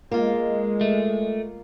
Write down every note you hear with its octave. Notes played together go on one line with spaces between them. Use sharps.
G#3 A#3 F4
A3